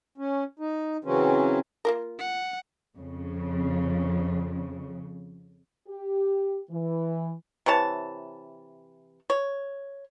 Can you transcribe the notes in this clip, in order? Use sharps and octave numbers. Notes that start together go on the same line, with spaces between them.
C#4
D#4
C#3 E3 F#3 C4 C#4
A#3 F4 A#4
F#5
F2 C#3
G4
E3
C3 E3 C#5 A5
C#5